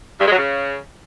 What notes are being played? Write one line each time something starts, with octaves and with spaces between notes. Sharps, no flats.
G2
G#3
F#3
C#3